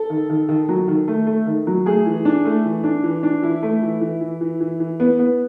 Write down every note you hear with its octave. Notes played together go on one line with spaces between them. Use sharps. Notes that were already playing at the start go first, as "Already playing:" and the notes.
Already playing: A4
D#3
D#3
D#3
F#3
D#3
A3
A3
D#3
F#3
A3 G#4
E3
D4
A3
E3
D4
E3
D4
E3 E4
A3
E3
E3
E3
E3
E3
E3
B3
B3